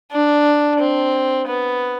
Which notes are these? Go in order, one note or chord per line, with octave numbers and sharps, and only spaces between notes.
D4
C4
B3